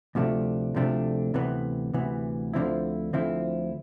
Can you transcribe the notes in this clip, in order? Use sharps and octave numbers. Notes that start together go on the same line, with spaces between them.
D2 C3 F3 A3 D4
D2 C3 F3 A3 D4
D2 C3 E3 B3
D2 C3 E3 B3
D2 D3 F3 C4 E4
D2 D3 F3 C4 E4